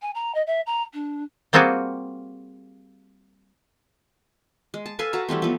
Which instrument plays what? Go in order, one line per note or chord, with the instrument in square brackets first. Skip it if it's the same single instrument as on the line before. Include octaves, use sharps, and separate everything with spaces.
[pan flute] G#5
A#5
D#5
E5
A#5
D4
[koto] G3 A#3 C4 F4 F#4 G#4
[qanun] G#3
A5
A4 B4 F5 G#5
F#4 B4 A5 A#5
E3 G3 A3 C4
F3 B3